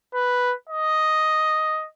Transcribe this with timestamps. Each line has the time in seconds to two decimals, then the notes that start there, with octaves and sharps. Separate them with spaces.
0.14 B4
0.69 D#5